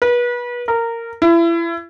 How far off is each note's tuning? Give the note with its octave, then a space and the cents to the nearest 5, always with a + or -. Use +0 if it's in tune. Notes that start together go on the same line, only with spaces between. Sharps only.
B4 -30
A#4 -15
E4 +30